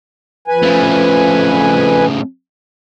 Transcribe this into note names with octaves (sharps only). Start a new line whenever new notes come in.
F2 B4 G#5
C#3 A3